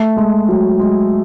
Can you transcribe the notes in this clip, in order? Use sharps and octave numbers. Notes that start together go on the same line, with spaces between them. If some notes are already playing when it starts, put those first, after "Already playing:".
Already playing: A3
G#3
F#3
G#3